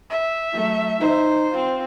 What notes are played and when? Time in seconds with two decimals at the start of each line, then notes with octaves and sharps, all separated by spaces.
0.10 E5
0.53 F#3 A3
1.01 D#4 C5
1.51 C4 F4